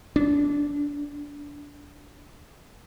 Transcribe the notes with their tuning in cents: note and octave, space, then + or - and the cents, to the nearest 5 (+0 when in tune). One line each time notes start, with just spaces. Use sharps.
D4 -20